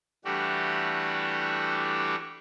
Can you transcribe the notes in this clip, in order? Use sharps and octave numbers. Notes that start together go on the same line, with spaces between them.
E3 G3 A3 D4 F#4 G4